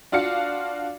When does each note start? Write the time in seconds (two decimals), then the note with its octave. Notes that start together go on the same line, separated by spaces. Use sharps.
0.12 D4 F4 F#4 F5 C#7